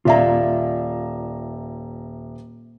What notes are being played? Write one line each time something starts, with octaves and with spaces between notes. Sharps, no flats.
D#1 F4 D5 E5 F5 A#5